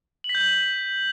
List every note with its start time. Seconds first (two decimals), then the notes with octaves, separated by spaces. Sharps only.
0.24 F#7
0.29 B6
0.35 G6
0.40 F#7